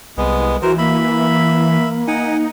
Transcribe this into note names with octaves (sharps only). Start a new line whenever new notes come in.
C2 G#3 B3
E3 F#4 A#4 C5
A#3 E5 B5
D#4 F#5 G#5